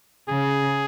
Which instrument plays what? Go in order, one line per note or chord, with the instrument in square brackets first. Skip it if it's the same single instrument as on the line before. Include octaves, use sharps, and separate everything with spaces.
[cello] C#3 [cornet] G#4